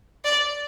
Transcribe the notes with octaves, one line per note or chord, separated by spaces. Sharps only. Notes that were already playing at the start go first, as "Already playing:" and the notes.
D5